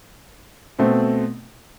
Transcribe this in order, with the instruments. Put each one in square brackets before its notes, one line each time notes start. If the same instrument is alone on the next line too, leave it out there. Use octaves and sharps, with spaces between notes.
[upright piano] B2 A3 C4